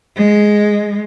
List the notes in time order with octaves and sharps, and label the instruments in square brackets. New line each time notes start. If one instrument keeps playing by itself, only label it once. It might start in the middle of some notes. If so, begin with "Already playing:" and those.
[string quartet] G#3